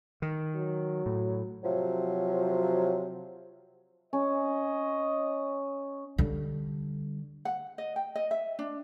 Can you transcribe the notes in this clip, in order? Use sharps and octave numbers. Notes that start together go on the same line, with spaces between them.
D#3
F#3
A2
C3 F3 F#3
C#4 D#5
D3 G3
F#5
D#5
G5
D#5
E5
D4